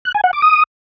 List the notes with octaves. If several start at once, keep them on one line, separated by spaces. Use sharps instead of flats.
F#6
G#5
F#5
D6
D#6